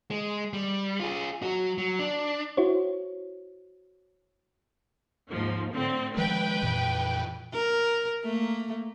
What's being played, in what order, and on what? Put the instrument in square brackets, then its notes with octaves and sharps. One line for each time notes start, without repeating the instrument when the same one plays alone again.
[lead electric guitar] G#3
G3
F4 G#4
F#3 F#4
F#3
D4
[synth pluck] E4 F#4 C5 C#5
[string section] D#2 G#2 F3
A2 D3 C4
[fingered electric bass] D#3 F3 G#3 [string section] B4 G5
[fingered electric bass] F2 A#2 E3
[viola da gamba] A#4
A3 A#3